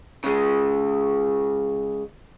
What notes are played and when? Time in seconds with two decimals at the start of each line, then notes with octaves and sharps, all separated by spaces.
0.24 C#3 G#3